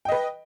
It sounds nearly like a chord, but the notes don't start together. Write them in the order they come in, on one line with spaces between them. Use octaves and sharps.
G5 D#5 B4